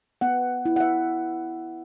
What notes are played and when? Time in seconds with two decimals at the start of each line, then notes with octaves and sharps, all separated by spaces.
0.21 B3 F#5
0.65 E4
0.76 F#5
0.80 E5